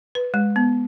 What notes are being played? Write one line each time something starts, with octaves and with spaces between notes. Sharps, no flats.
B4
G#3
B3